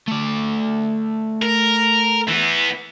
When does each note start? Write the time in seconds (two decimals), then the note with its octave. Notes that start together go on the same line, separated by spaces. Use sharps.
0.08 A3 D5
1.43 A#4
2.28 E3 B3